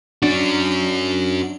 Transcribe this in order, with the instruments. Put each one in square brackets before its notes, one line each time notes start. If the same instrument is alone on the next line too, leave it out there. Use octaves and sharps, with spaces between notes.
[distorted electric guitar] C#4 F#4 [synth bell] D4